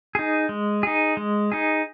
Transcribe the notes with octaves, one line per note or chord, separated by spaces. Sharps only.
D#4 G#4
G#3
D#4 G#4
G#3
D#4 G#4